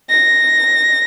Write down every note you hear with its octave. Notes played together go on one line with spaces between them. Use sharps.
A#6